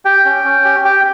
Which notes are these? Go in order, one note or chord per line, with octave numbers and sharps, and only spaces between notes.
G4 G5
C#4
C#4
G4
G4 G5